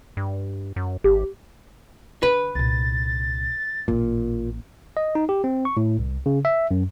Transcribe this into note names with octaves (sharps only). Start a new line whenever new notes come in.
G2
F#2
G#1 G4
D3 B4
C2 A#2 A6
A1 A#2 A#3
D#5
D#4
G4
C4
C#6
A2
C2
C#3
E5
F#2